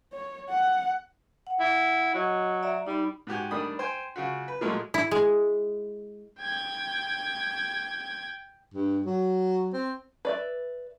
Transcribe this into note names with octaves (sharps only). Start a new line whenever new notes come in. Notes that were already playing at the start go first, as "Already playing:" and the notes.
C#5
F#5
F#5
E4
F#3 D#5
D5 E5 A#5
G3 D#4 B5
G#2 F#4 G4 G#5
D#3 G3 A3 D4 B5 D#6
C5 G5 G#5
C#3 F4 F#4
B4
A#2 F3 F#3 G#3 A3
E4
G#3
G5 G#6
G2
F#3
C4
B4 D5 E5